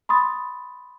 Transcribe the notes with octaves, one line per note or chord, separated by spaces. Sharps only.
B5 C6 D#6 A6